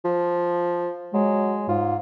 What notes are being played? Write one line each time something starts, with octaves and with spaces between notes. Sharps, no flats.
F3
F#3 G#3
G#2 F4